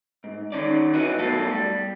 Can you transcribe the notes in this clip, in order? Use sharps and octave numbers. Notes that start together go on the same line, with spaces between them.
G#2
D#3 C#4 D5
E4 F#4 B4 C#5 D#5
B1 B2 F#3 A3 A#3 A4
G3